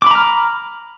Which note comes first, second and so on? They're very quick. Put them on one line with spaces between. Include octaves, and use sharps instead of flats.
D6 B5 A#5 F6